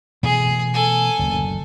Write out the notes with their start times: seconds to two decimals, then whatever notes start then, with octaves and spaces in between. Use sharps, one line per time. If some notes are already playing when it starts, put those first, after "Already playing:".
0.23 B2 E3 A3 G#4
0.74 A4 G#5
1.19 F#1 D2